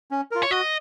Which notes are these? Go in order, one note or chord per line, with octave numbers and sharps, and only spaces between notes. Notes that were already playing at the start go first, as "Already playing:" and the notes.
C#4
F4 A#4
C#5
F#4 D#5